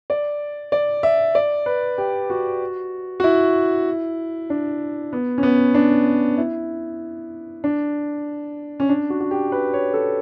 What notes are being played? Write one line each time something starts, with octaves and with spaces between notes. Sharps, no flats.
D5
D5
E5
D5
B4
G4
F#4
F#4
E4
D4
B3
C#4
B3
D4
E4
D4
C#4
D4
F#4
F#4
G4
B4
C#5
A4